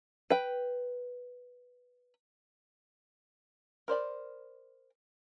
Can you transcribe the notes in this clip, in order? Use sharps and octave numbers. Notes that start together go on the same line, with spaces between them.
B4 G5
A#4 C5 D5 B5